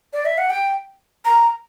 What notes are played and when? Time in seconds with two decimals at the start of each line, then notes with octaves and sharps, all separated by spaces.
0.13 D5
0.25 E5
0.38 F#5
0.50 G5
1.25 A#5